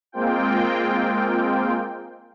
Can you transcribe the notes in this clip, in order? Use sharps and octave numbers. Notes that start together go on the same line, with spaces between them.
G#3 A#3 C4 F4 G5